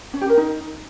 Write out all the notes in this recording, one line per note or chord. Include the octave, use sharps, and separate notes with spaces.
C#4
G4
A#4
D#4